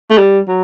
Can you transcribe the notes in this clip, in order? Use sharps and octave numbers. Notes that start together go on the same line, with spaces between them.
A3
G3
F#3